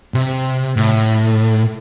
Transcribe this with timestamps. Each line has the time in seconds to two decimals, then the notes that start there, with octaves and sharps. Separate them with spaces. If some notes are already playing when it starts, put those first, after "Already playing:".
0.14 C3
0.77 A2